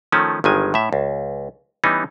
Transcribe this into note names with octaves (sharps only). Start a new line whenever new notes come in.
D#3 F3 A3 C#4
G1 G2 D#3 G#3 G#5
A2 E5
C#2
E3 G3 B3 C#4 D#4